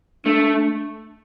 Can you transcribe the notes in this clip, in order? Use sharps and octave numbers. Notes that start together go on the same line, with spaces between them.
A3 D4